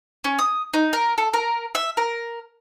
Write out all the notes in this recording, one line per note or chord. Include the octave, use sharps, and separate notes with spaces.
C#4
D#6
D#4
A#4
A4
A#4
E5
A#4